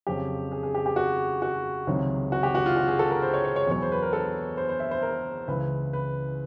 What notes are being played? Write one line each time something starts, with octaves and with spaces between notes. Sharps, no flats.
F2 C#3 F#3 G4
G#4
G#4
G4
G4
F#4
F#4
C#2 C3 D#3 F#3
F#4
G4
F#4
F4
F#4
G#4
A4
A#4
C5
C#5
C#5
C#5
E2 B2 F#3 C#5
C5
B4
A#4
A4
C5
C5
E5
C5
A#4
C#2 C#3 E3 B4
B4